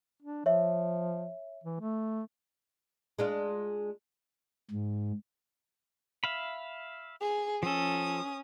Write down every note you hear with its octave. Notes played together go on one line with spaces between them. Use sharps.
D4
F3 C#5 E5
E3
A3
G#3 D4 F4
G#2
E5 F5 B5
G#4
F3 C#4 A4 D#6